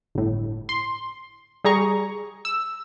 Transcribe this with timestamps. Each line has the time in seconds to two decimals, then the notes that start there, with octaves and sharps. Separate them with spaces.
0.15 G1 A2
0.69 C6
1.64 G3 G#4 A#5 C#6
2.45 E6